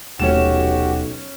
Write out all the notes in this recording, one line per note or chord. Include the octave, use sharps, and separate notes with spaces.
D#1 B1 A3 C#4 F#4 G4 E7